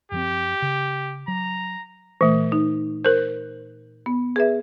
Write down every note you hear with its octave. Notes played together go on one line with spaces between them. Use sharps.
F#2 F3 C4 G4
C#3
F#3 A#5
A#2 E3 A3
D#4
A#4 C5
B3
G#4 B4 E5